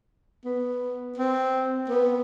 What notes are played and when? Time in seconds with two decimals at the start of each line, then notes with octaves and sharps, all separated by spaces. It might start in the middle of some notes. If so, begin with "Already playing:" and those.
0.45 B3
1.17 C4
1.89 B3